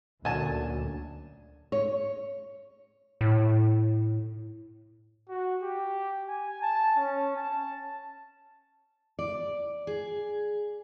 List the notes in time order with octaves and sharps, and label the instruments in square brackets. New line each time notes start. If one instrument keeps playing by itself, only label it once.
[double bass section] D2 [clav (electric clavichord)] A#2 F#3 C#4 [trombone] D4 [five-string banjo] G#5 A5
[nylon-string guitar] C#5
[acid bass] A2
[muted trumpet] F#4
G4
G#5
A5
C#4
A5
[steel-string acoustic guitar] D5
G#4